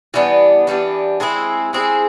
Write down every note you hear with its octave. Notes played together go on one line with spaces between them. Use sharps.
E3 G3 B3 D4
E3 G3 B3 D4
G#3 C4 E4 G#4
G#3 C4 E4 G#4